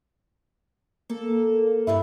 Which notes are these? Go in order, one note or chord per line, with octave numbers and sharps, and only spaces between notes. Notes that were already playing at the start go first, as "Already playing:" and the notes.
A#3 A4
G2 A#2 D4 E4 B4